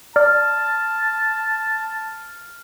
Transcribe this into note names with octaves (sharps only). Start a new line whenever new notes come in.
D5 A5 F6